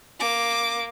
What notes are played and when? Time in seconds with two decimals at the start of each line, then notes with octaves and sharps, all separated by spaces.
0.20 A#3 D6